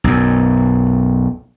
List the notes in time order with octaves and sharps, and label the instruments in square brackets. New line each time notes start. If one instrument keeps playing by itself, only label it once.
[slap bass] B1 F#2